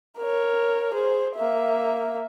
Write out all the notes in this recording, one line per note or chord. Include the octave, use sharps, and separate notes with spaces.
A#4 C#5
G#4 C5
A#3 E5